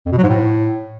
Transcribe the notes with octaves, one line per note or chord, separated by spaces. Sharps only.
F2
B2
F#3
G#2
A2